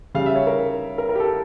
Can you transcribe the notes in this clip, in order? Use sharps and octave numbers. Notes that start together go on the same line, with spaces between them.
C#3 G3 F5
E5
C#5
A#4
A#4
A#4
G4
A4